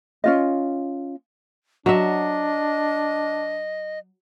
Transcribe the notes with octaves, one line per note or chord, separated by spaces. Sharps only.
C#4 F4 D#5
F#3 D4 D#5 E5